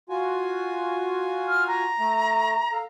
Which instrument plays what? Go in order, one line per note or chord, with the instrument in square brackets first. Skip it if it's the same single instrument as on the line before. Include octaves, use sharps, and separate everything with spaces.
[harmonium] F4 F#4 G#5
[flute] F6
A#5
[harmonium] A3
A4 F5